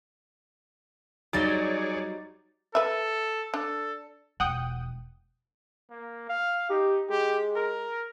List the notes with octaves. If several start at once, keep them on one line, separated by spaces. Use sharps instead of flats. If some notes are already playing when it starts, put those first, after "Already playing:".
F#3 G3 D#4 G#4 C#5 D5 A6
A4 B4 E5
D4 A4
E1 F3 F#5 G5 D#6
A#3
F5
D#4 G4
G#3 G4
A#4